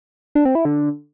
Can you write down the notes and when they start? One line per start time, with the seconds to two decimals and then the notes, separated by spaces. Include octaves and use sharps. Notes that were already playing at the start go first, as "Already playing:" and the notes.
0.35 D4
0.45 C4
0.55 E4
0.65 D3